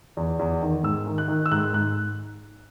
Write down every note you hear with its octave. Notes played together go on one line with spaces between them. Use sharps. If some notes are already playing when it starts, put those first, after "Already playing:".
E2
E2
D#3
G#2 E6
D#3
F#6
D#3
E6
G#2 F#6
G#2 F#6